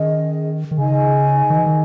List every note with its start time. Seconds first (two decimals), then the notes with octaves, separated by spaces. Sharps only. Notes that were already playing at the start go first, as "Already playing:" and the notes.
Already playing: D#3 C#4 G#4 D#5
0.71 D#3
0.78 C#3 D#4 G#4 D#5 G#5
1.50 D#3
1.57 E3
1.66 D#3